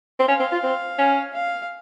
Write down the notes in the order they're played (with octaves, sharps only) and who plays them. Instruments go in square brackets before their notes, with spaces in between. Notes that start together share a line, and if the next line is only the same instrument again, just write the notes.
[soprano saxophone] C4
[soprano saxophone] C#4 [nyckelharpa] F5
[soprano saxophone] C4
F4
C4
C#4
[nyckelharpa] F5